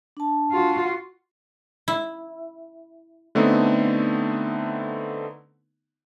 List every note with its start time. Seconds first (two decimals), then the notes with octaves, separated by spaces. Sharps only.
0.17 D4 A5
0.52 F4 F#4
1.88 E4
3.35 D3 A3 B3 C4 D#4